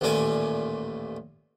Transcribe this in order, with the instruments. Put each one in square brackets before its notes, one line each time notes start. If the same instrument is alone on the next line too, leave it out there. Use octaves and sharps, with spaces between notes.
[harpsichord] A1 D#2 A#2 A3 D5 G#5